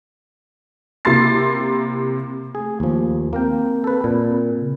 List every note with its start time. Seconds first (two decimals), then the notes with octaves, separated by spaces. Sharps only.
1.05 C3 A#3 E4 C6 A6 C7
2.55 A3 G#4
2.80 D#2 F3
3.33 A#3 C4 A#4 G5
3.84 A4 B4
4.04 A#2
4.59 C#3